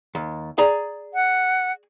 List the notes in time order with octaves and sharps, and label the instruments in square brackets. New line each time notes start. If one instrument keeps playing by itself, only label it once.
[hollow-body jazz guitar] D#2
G#4 D5 A#5
[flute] F#5